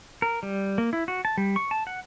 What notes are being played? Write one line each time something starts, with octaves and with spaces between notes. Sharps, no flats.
A#4
G3
A#3
E4
F#4
A5
G3
C#6
A5
F#5